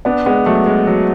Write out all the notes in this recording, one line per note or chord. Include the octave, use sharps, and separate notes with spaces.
B3 D4
G#3 B3
F#3 A3
G#3
F#3